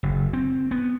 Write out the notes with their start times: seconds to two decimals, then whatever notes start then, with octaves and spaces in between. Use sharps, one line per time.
0.03 F#1
0.33 C4
0.71 B3